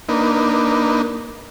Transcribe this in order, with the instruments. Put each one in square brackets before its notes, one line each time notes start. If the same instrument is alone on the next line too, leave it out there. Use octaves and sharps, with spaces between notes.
[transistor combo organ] A#3 D4 D#4 B4